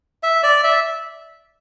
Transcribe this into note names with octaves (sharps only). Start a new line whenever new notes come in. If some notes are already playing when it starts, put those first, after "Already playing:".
E5
D5
E5